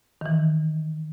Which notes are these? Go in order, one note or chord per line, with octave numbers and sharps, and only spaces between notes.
D#3 E3